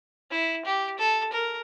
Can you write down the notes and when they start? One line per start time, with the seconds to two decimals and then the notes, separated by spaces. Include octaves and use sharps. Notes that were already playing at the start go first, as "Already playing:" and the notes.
0.31 E4
0.65 G4
0.98 A4
1.32 A#4